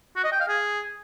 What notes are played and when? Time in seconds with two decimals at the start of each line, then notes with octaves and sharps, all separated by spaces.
0.16 F#4
0.24 D#5
0.32 G5
0.40 F5
0.49 G#4